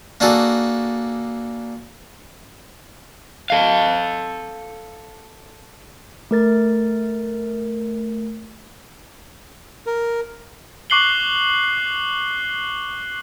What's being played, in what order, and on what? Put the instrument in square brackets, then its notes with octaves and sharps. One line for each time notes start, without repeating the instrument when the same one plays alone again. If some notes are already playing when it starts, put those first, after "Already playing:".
[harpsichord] A#3 D4 F#4 G#4 A4
[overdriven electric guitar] A4 F5
[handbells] A3 A#4 A6
[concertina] A#4
[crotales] C#6 D6 F#6 C7 F#7 G7